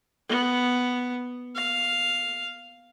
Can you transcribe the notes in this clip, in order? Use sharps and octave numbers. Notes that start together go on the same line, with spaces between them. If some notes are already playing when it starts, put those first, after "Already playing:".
B3
F5